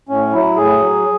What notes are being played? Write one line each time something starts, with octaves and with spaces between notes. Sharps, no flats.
A2 C#4
F#3 E4
A2 G#4
F#3